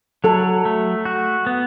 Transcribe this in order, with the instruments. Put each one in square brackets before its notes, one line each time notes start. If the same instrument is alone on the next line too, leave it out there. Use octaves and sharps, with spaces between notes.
[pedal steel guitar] F#3 [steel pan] A4
[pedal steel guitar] A3
F#4
B3